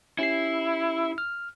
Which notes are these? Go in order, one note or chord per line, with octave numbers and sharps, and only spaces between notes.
C#4 E4 G4 C7
F6